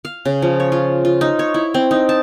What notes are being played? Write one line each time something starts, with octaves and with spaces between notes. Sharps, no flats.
F5
C#3
F3
C#5
F4
F4
D#4
C#5
E4
C4
D#4
A5